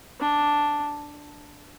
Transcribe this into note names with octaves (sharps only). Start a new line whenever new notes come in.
D4